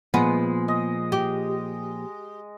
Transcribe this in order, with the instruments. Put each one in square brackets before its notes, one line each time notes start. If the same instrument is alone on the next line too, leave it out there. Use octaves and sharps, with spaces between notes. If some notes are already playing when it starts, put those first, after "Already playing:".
[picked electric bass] A#2 F3 [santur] G#3 [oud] B3
[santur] D#5
[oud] G4